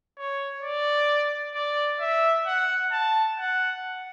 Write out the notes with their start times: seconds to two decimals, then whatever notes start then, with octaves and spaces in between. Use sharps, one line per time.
0.18 C#5
0.62 D5
1.55 D5
2.01 E5
2.47 F#5
2.92 A5
3.38 F#5